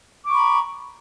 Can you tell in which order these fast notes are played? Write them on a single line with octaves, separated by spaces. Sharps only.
D6 C#6 B5 A#5